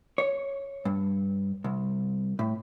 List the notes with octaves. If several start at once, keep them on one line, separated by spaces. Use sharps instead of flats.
C#5
G2
C2
A2